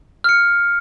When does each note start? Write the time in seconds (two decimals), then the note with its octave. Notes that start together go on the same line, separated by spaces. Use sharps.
0.24 F6 C#7